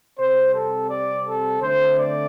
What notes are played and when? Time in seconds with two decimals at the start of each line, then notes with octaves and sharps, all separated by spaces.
0.19 C3 G3 C4 C5
0.54 A4
0.90 D5
1.26 A4
1.61 D3 A3 C4 C5
1.97 D5